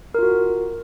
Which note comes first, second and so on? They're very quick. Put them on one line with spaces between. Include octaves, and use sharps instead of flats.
A#4 F4 F#4